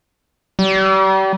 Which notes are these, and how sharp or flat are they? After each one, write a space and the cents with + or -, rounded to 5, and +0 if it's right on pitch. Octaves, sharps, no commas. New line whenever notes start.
G3 -35